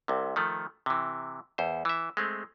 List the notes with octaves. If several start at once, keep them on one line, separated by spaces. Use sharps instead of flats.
C2 C3
D#3 F3 A3
C3 E3
E2 C5
E3 E5
G#3 A3 C4